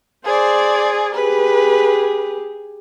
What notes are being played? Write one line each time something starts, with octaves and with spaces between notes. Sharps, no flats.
G#4 C5 D5
G4 G#4 B4